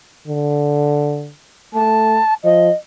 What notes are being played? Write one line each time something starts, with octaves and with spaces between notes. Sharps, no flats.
D3
A3 A5
F3 D#5